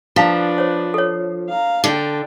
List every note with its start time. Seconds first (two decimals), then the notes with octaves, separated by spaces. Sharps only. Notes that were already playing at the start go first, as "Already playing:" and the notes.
0.16 F3 D4 E4 B4 F5 A5
0.58 C5 C#5
0.94 A4 C#5
1.49 F5 A#5
1.84 D3 G5 A5